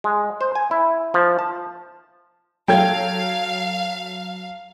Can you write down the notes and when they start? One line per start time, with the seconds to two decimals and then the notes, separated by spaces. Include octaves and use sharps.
0.04 G#3
0.41 C5
0.55 G#5
0.71 E4
1.14 F3
1.39 A5
2.68 F#3 A4 F5 G5 G#6